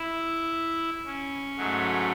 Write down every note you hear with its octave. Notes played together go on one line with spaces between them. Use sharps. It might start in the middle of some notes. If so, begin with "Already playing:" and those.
Already playing: E4
C#4
G#2 F#3 A3